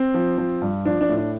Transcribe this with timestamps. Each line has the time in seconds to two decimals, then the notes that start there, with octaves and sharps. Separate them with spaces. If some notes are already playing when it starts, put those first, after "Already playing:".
Already playing: C4
0.14 F3
0.38 F3
0.62 G2
0.85 F3 D4
1.01 D4
1.09 A2
1.17 D4